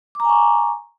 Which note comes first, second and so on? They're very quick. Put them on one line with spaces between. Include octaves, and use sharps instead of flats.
D6 A#5 G#5 C#6